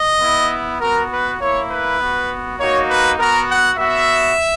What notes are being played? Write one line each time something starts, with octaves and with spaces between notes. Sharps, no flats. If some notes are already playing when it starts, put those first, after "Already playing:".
Already playing: D#5
B3 E4
B3 F#4 A#4
B4
A#3 E4 C#5
B4
B3 F#4
A#3 D#4 F#4 C#5
B4
B3 F#4 A#4
F#5
B3 F#4 E5